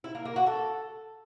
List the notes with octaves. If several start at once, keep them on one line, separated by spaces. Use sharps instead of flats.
E4
A#3
A#3
F#4
A4